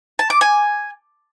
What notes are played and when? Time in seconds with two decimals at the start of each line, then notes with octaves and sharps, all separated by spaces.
0.19 A5
0.30 D6
0.41 G#5